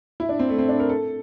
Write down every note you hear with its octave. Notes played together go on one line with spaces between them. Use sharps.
E4
D4
C4
A3
C4
D4
A#4
A4